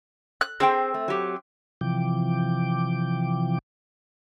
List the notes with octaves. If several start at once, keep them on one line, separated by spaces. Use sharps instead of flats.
F#6
C4 G#4 C5 G5
A3
F#3 G4
C3 E3 F3 G5 D6